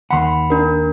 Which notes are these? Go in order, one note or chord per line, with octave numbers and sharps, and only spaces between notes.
D#2 F#5 B5 C6
D4 A#4